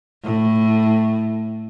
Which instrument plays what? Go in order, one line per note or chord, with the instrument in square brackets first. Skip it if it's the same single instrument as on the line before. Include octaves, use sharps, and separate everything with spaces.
[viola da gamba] A2